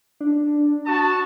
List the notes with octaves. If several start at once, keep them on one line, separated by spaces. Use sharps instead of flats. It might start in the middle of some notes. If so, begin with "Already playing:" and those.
D4
F#4 A5 D#6